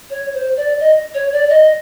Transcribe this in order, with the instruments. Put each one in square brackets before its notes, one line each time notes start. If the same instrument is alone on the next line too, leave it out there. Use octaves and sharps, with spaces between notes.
[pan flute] C#5
C5
D5
D#5
C#5
D5
D#5